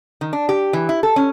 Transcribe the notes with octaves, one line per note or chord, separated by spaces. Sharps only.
D#3
D4
G4
E3
E4
A4
C#4